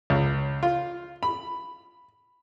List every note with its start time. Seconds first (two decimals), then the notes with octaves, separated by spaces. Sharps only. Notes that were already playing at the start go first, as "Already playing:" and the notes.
0.10 C#2
0.63 F4
1.23 B5